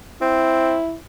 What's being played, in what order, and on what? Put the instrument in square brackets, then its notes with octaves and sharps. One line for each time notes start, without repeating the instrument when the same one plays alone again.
[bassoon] C4 [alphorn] E4